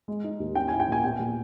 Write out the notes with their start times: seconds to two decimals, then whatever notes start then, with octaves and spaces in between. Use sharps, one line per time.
0.08 G#3
0.24 D#4
0.40 D#2
0.55 C#4 G5
0.68 E4 G#5
0.80 G5
0.88 A#2 G#5
1.04 B3 G5
1.20 A#2